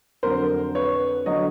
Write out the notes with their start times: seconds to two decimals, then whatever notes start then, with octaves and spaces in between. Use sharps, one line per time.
0.23 F2 D3 F#3 A#4 C5
0.75 B4 C#5
1.26 D3 F#3 C#5 D#5